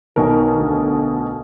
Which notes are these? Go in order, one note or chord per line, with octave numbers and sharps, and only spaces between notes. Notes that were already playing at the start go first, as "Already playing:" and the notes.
B1 B2 D#3 A#4
D2